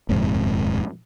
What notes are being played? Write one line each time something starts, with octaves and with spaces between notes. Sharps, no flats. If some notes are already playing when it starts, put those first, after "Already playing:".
D#1 F2 G#2 C3